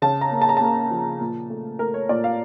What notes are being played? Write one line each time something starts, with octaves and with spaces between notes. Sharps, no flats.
C#3 A5
A#5
A#3
A5
A#5
A#3 A5
F3
A#2
A3
A3 A#4
C#5
A#2 D5
F5